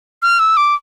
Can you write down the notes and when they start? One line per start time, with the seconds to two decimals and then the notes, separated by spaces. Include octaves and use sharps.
0.23 F6
0.39 E6
0.57 D6